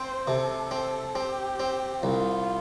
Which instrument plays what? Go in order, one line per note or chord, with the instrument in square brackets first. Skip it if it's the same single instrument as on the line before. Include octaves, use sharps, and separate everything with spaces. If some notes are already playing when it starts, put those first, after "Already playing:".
Already playing: [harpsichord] C4 [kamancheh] C5
[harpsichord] C3 [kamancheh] A4
[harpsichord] C4
[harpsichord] C4 [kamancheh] G4
[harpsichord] C4
[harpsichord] C2 [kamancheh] F4